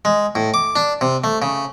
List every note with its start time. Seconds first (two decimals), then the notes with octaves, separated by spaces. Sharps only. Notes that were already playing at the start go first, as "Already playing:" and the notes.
0.05 G#3
0.35 A2
0.54 D6
0.76 D4
1.01 C3
1.24 A3
1.42 C#3